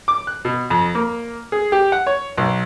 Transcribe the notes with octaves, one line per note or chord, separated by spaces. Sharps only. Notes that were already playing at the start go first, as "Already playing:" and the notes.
D6
F#6
B2
F2
A#3
G#4
G4
F#5
C#5
B1